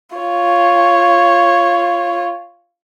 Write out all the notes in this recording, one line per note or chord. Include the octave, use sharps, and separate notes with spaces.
F4 C#5